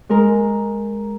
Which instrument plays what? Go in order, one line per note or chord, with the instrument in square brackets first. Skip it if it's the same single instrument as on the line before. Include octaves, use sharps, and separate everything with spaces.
[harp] G#3 A#4